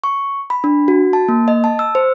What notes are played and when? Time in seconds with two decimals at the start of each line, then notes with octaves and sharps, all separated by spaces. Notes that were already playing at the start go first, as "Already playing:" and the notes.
0.04 C#6
0.50 B5
0.64 D4
0.88 F#4
1.13 A5
1.29 A#3
1.48 D#5
1.64 A5
1.79 E6
1.95 C5